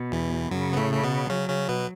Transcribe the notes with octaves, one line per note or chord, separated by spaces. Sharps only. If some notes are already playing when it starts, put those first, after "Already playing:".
Already playing: B2
E2 E3
F#2 C#3 F#3
B3
A2 A3
A3
B2 B3
C#3 F#3 C#4
C#3 C#4
B2 B3